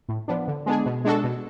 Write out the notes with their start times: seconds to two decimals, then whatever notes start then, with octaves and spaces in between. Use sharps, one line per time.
0.09 A2
0.28 F3 B3 D4
0.48 D3
0.66 G#3 B3 D4 G#4
0.86 B2
1.05 G#3 D4 F#4 A4
1.24 B2